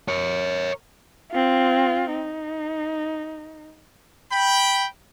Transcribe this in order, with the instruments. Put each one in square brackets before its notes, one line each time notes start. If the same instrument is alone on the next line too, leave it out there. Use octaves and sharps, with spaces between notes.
[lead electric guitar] A#4 C#5
[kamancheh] C4 F4
D#4
[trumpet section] G5 B5